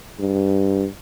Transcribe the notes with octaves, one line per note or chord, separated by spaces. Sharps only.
G2